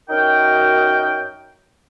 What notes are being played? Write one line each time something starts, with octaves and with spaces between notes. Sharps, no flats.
F#2 D#4 F#4 A#4 G5